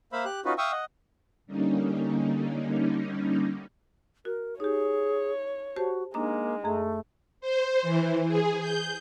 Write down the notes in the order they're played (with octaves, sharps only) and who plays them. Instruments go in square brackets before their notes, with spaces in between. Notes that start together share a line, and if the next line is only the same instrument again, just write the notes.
[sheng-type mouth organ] A#3 C5 E5 F5 B5
G4 F#6
C#4 D#4 F4 F#4 B4
E5 F5 G5 C#6 D#6 E6
D#5 F#5
[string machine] D3 G3 A#3 C#4 D#4
[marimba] F#4 [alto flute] A#4
[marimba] D#4 G4 [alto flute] G#4 [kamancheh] C#5
[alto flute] F#4 [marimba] G4 C5 A5
[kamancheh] G#3 [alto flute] A#3 [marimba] D4 D#4 A#5
[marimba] F#2 G#4 [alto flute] A3
[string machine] C5
E3
G#4
G6